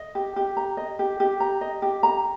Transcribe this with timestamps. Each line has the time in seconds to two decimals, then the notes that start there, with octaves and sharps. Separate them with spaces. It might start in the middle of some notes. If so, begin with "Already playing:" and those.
Already playing: D#5
0.15 G4
0.36 G4
0.57 A#5
0.77 D#5
0.99 G4
1.20 G4
1.40 A#5
1.61 D#5
1.82 G4
2.03 A#5